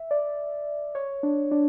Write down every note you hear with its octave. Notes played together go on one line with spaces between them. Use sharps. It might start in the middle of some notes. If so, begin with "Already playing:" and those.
Already playing: E5
D5
C#5
D4
D4